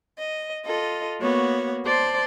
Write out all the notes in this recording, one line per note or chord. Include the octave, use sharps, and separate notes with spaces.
D#5
F4 A4 D#5
A#3 B3 F#4 C#5
C5 D5 A5 C6